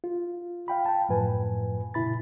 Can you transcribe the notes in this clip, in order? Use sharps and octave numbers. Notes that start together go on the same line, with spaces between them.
F4
F5 G5 B5
G5 A5
F#2 A2 F3 B4 G#5
A#2 C#3 E4 B5 A6